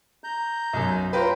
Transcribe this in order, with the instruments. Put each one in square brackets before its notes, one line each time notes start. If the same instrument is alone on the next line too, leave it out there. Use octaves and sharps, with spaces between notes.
[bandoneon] A#5 G6
[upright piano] B1 F#2
[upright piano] C#4 F4 B4 [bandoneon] C5 G5 A#5